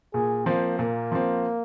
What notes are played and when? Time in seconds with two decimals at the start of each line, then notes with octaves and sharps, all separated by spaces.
0.14 A#2 G#4
0.46 F3 A#3 C4
0.79 A#2 A#3
1.12 F3 C4